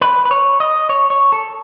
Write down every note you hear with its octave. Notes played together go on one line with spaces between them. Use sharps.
B4
B4
C#5
D#5
C#5
C#5
A4